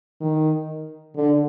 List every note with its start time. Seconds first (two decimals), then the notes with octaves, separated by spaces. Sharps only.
0.21 D#3
1.16 D3